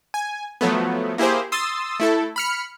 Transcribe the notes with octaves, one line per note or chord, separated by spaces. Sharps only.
G#5
F3 F#3 A3 B3
A#3 E4 G4 G#4 C5
C6 D#6 E6 A6
A3 E4 A4
B5 F6 C#7